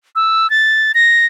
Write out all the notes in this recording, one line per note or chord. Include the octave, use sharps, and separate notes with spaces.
E6
A6
A#6